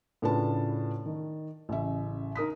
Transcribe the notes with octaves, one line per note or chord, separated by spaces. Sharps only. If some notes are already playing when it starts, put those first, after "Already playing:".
A2 C#3 D4 F4 B4 A5
D#3
A1 C#3 E5
D#4 A#4 D#6 B6